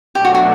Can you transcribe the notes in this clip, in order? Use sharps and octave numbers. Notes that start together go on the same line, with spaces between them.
B2 F#3 A3 D4 G4
F#4
F#4